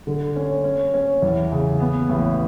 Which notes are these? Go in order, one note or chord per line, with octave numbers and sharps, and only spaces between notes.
D3
C#4
C#4
C#4
E2
C#3
B3
A1